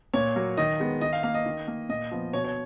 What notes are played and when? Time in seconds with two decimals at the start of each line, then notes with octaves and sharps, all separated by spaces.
0.14 A#2 C#5
0.36 F#3 A#3
0.57 D#3 D#5
0.80 G#3 B3
1.01 D#3 D#5
1.13 F5
1.23 A#3 F5
1.34 D#5
1.46 D#3
1.68 A#3
1.89 A#2 D#5
2.11 F3 B3
2.33 B2 C#5
2.44 C#5